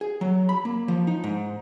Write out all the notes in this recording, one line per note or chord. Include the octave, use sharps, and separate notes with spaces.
G#4
F#3
B5
A#3
F3
D#4
G#2